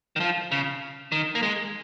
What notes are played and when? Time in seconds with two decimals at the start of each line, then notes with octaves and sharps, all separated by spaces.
0.16 D#3
0.20 F3
0.51 C#3
1.12 D#3
1.35 A#3
1.43 G#3